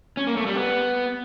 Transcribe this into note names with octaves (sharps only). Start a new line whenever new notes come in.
C#4
A#3
A3
G3
B3